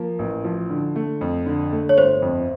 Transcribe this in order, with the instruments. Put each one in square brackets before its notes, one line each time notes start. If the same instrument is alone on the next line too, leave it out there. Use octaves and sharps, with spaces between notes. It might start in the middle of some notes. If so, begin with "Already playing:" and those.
Already playing: [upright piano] F3 A#3
A1
F3
D3
A3
F2
D3
A3
[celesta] C#5
[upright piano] G1 [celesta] C5
[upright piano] F2